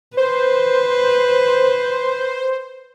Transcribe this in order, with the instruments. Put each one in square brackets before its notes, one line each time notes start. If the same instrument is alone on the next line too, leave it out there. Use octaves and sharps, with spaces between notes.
[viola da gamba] B4 [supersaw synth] C5